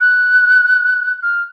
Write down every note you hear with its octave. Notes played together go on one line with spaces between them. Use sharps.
F#6
F6